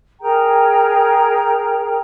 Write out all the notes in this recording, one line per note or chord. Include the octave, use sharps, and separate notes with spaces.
G#4 A#4 G5 A#5